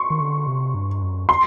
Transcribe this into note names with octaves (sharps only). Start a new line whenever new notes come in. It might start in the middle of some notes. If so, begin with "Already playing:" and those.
Already playing: C6 C#6
D#3
D3
C3
G2
F#2
C6